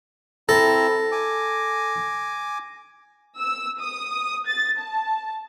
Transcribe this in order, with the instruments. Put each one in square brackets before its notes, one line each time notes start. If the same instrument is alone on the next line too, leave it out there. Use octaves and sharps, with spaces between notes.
[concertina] C4 E4 A#5 [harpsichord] A4 [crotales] A#6
[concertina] G#5 D6
[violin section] E6
D#6
A6
A5